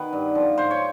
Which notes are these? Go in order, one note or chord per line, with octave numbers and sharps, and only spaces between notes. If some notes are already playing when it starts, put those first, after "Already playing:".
Already playing: B2 D#3 B3 B4
G2
D3 F3
G#2 C5
C#5